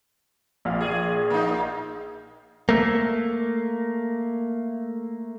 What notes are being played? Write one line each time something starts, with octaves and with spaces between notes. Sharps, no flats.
A#1 F5
G#4
A#3 D#4
A3 A#3